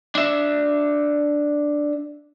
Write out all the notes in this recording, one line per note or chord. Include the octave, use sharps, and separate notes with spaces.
D4 E5